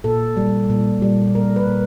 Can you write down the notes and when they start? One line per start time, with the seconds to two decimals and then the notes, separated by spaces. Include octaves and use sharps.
0.04 A#2 A4
0.37 G3
0.70 A#2
1.02 G3
1.35 A#2 A#4
1.56 B4
1.67 A#2